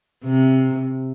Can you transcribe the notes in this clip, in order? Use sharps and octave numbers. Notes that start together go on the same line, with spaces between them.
C3